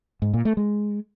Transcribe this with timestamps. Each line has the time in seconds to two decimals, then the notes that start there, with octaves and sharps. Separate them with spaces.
0.22 G#2
0.34 A#2
0.45 A3
0.57 G#3